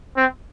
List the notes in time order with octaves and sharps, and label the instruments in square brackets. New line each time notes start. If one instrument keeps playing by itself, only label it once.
[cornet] C4